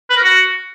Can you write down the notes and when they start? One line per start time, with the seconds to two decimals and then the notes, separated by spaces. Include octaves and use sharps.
0.10 B4
0.16 A#4
0.23 F#4